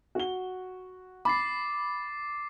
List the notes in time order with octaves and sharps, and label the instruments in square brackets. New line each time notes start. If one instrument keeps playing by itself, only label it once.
[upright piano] F#4 G7
[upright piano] B5 [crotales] D6 A6 C7